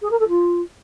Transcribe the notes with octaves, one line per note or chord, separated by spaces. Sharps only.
G#4
A#4
A4
F4